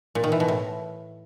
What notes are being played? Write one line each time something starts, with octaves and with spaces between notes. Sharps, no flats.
A#2
D#3
E3
B2
A2